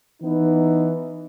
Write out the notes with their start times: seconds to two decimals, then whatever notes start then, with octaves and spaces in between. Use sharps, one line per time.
0.22 E3 B3 D#4